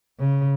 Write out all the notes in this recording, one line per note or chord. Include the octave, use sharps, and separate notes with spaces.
C#3